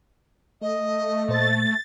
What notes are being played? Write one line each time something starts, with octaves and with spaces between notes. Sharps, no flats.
A3 D#5
A#2 C5 A6